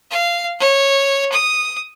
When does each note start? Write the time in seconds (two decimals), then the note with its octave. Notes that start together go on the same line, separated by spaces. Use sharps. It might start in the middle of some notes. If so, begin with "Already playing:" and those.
0.10 F5
0.59 C#5
1.32 D#6